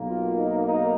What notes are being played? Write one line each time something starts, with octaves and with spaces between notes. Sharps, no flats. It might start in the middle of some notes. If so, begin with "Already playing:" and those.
Already playing: B1 B2 A#3
F4
D#4
D#4